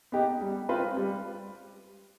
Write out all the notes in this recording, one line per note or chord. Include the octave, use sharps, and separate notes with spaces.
B3 D#4 G4
G3
C4 F4 B4
G3